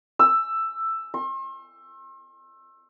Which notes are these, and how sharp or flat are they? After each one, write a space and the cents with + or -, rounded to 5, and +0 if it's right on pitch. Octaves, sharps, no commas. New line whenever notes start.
E6 +10
C6 +45